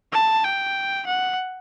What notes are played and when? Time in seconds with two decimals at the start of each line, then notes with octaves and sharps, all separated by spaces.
0.13 A5
0.44 G5
1.07 F#5